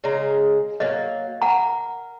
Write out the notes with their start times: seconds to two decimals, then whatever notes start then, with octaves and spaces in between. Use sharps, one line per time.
0.04 C#3 G#3 A#5
0.80 F#3 A#3 D#5
1.42 A#4 F#5 A#5